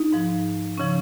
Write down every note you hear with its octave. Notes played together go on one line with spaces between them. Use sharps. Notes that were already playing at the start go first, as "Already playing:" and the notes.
Already playing: D#4
G#2 F3
C#3 F3 C#4